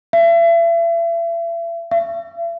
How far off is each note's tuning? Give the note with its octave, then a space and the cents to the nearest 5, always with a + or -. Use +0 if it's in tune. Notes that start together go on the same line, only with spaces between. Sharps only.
E5 +35
E5 +45